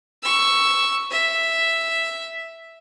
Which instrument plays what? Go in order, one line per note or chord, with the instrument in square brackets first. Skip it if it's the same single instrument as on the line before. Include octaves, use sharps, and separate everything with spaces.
[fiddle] C#6 E6
E5